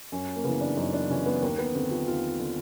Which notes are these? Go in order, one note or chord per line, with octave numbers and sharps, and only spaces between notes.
F#2 C#4
A#3
C#3 E3 B3
D4
F#2 D#4
D4
C#3 E3 C#4
B3
D#2 A#3
B3
D3 C4
F4
D#2 F4
D3